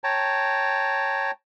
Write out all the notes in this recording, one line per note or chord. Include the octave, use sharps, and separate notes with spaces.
C#5 G5 A5 A#5